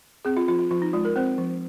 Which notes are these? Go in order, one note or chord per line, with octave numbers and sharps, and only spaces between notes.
C4 G#4
F4
F3 F4
F4
F3 F4
D#4
G#3 F4
A#4
C4 C5
F3